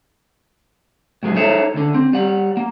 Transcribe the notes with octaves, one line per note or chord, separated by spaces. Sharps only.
A2 F#3 G#3
D#4 G#4 A4 C#5 E5
D2 D3
C4
G3 F#5
A#3